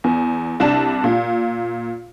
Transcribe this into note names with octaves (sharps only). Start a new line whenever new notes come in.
E2
C2 D4 A5
A#2